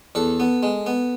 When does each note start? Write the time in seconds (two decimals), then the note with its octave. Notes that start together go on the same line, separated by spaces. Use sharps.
0.15 E2 A4
0.40 B3
0.63 G#3
0.86 B3